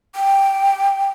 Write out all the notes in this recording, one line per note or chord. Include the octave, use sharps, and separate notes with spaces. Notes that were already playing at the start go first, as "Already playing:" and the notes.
G5